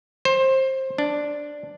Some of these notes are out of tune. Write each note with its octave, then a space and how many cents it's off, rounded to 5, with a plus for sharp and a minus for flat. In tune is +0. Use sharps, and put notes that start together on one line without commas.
C5 +20
D4 +0